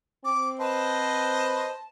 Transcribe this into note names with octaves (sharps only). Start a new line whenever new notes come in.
C4 D6
B4 C5 D#5 A5